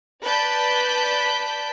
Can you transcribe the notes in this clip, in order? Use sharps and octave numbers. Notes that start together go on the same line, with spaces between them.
B4 D5 A5 G6 B6